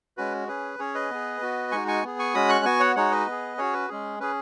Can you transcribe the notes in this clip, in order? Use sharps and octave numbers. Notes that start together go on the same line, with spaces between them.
G#3 C#4 F#4 B4
C#4 G#4 B4
C#4 G#4 C#5
B4 D#5
B3 G#4
B3 F#4
G#3 D#4 F#4 G#5 C#6
G#5 C#6
B3 G#4
G#5 C#6
G#3 C#4 F#4 B5 D#6
C#6 F#6
B3 F#4 G#5 C#6
C#5 F#5
G#3 D#4 F#4 C#5 F#5
B4 D#5
B3 G#4
C#4 F#4 G#4 C#5
B4
G#3 C#4 G#4
C#4 G#4 B4